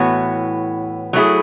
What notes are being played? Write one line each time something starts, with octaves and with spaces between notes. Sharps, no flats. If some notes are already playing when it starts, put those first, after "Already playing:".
Already playing: A2 E3 B3 F#4 C#5
F#3 A3 E4 G#4